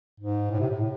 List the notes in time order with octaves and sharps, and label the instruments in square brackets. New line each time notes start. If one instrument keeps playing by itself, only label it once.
[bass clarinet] G#2
A2
C3
A2
A2